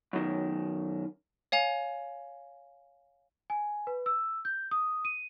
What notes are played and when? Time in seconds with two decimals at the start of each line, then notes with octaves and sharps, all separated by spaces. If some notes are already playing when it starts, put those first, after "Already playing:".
0.13 F#2 D#3
1.52 C#5 F5 G#5 F7
3.50 G#5
3.87 B4
4.06 E6
4.45 G6
4.71 D#6
5.05 D#7